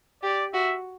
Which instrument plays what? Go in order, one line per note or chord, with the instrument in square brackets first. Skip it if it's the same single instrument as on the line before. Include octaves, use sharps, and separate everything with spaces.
[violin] G4 [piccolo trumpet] D5
[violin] F#4 [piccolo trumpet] E5